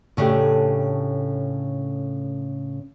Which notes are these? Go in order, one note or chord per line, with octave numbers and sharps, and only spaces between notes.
A2 C#3 A3 D4 G4